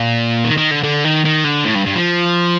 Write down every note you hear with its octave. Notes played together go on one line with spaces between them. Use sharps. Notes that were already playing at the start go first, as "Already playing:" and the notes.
Already playing: A#2
D#3
D#3
D3
D3
D#3
D#3
D3
A2
G2
G2
F3